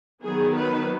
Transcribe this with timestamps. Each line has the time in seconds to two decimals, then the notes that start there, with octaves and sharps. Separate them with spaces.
0.23 D#3 F#3 B3 G#4
0.54 B4